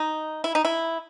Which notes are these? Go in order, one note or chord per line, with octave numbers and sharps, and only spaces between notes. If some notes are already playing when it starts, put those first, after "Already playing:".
Already playing: D#4
E4
D#4
E4